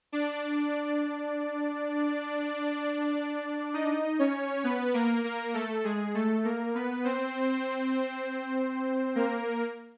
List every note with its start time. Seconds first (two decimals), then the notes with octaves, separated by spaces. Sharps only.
0.12 D4 D5
3.74 D#4 D#5
4.19 C#4 C#5
4.64 B3 B4
4.94 A#3 A#4
5.24 A#3 A#4
5.54 A3 A4
5.84 G#3 G#4
6.14 A3 A4
6.45 A#3 A#4
6.75 B3 B4
7.05 C4 C5
9.16 A#3 A#4